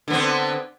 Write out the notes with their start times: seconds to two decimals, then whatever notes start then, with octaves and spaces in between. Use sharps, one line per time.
0.08 D3
0.10 B3
0.13 C4